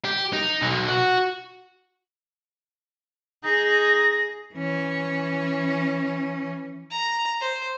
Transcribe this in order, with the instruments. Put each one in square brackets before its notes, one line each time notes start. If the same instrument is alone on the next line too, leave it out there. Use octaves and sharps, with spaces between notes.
[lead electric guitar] G4
D#4
B1
F#4
[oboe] D#4 [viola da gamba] G#4 [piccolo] A#6
[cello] E3 C#4
[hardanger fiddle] A#5
C5